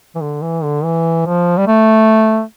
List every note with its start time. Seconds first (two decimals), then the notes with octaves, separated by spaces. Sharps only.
0.15 E3
0.22 D3
0.42 E3
0.64 D3
0.84 E3
1.26 F3
1.58 G3
1.68 A3